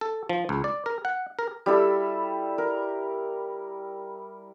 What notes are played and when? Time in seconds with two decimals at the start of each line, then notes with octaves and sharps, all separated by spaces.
0.01 A4
0.29 F3
0.49 C#2
0.64 D5
0.86 A#4
1.05 F#5
1.39 A#4
1.66 G3 E4 A4 E6
2.58 A#4